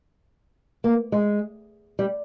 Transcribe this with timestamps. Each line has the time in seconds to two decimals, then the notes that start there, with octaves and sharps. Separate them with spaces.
0.84 A#3
1.12 G#3
1.99 G3